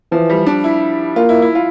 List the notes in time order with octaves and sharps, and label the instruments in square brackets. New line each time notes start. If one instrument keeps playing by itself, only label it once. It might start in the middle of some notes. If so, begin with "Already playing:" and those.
[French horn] E3 [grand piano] F3
[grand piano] G3
D4
E4
[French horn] A#3 [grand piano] F4
[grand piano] E4
E4
F4